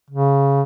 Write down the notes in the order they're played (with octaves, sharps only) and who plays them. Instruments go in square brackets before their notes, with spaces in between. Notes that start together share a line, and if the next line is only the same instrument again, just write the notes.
[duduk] C#3